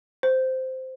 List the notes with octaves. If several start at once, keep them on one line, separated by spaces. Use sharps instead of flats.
C5